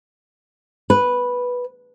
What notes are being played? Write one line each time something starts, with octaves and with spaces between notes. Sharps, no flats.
B4